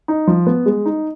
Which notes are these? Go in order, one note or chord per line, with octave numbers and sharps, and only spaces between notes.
D#4
F3
B3
G#3
D#4